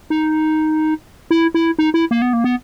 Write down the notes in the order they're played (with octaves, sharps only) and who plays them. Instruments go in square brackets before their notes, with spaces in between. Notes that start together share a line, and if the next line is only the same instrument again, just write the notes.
[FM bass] D#4
E4
E4
D#4
E4
A#3
B3
A#3
B3